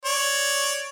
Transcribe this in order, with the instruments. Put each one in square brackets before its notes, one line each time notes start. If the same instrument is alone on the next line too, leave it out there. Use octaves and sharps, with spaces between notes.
[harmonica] C#5 D5